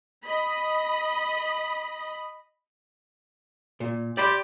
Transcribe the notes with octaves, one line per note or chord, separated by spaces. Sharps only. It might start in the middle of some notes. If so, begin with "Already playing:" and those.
D#5 B5
A#2
G4 D5 B5 C6